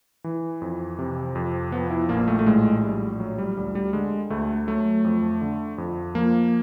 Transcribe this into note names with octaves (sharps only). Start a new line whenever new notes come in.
E3
F2
C3
F2
F3 B3
E4
A#1 A#3
A3
A3
A2 G#3
A#1 G3
F#3
G3
D2 G3
G3
D3 G#3
D2 A3
F#3 A3
F2
D3
F2
F3 A#3